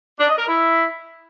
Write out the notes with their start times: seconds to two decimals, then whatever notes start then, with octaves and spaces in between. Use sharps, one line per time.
0.20 D4
0.29 D#5
0.38 A#4
0.48 E4